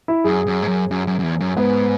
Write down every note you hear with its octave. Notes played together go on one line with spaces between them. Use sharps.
E4
F#2 G#4
F#2
G#2
F#2
F#2
F#2
F#2
E2
F#2
G#2 B3